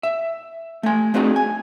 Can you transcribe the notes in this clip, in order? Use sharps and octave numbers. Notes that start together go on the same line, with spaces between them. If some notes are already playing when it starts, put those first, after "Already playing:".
E5
A3 G#5
A3 C4 D4 D#4 F#4 G#4
G#5